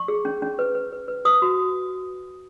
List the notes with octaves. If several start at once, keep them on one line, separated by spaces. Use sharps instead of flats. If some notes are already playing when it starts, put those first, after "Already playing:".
Already playing: C#6
G#4
C#4
C#4
B4
B4
B4
B4
B4 D#6
F#4